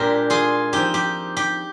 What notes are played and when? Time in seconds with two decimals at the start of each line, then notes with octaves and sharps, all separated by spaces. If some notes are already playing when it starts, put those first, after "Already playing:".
Already playing: A#2 G#3 D4 G4 A#4
0.30 F4 G#4
0.73 F3 C4 D#4 G4
0.94 G4
1.37 G4